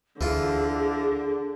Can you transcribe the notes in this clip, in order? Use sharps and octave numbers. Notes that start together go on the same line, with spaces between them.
D2 D3 E3 F4 G#4